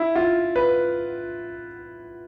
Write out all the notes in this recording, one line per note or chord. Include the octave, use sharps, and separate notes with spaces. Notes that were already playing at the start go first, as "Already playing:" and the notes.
Already playing: E4
F4
B4